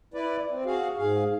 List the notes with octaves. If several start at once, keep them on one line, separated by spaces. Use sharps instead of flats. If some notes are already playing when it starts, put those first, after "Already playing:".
E4 B4 D5
C4
F#4 G#4 F5
G#2 G#4 F5